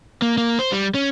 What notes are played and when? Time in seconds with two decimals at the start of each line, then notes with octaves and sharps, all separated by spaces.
0.22 A#3
0.38 A#3
0.59 C5
0.72 G3
0.94 C#4